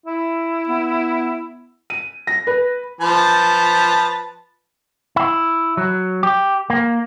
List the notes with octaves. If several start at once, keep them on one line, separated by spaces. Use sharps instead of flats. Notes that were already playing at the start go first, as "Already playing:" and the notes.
E4
B3
D#7
A#6
B4
F3 B4 A5
E4
F#3
G4
A#3